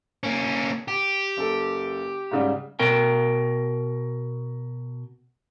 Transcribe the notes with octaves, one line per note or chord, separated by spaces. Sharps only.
A#3 C#4
G4
F#1 A4
G#2 C#3 G3
B2 A#4 G5